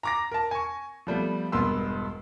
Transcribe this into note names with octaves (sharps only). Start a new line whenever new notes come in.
A#5 D6 A#6
A#4 A5
G#5 C#6
F3 G3 A3 B3
E1 G2 B3 A#4 C6 E6